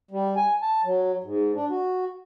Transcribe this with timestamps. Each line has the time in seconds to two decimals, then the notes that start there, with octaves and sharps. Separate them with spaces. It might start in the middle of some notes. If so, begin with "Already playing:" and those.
0.11 G3
0.37 G#5
0.62 A5
0.84 F#3
1.24 G#2
1.55 D4
1.70 F#4